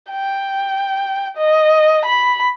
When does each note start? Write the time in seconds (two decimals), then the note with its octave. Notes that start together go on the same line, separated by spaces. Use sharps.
0.11 G5
1.37 D#5
2.05 B5